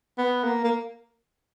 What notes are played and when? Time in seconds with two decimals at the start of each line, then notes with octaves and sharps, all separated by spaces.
0.18 B3
0.44 A#3
0.64 A#3